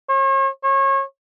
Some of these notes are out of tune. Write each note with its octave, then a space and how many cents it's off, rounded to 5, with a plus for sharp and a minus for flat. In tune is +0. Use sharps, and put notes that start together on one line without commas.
C#5 -40
C#5 -30